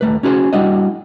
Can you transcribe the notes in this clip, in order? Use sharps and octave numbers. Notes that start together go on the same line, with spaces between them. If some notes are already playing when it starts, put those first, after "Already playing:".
D#2 A3 B4
C#4 F#4 G#4 B4 C5
G3 D4 E4 F#4 D#5